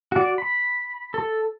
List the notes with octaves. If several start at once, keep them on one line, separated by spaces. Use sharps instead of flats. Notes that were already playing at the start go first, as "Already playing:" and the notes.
F#4 D5
B5
A4